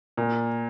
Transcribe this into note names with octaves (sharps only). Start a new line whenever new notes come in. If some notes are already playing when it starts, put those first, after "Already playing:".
A#2